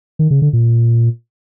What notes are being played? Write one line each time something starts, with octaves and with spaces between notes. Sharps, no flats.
D#3
C#3
D3
A#2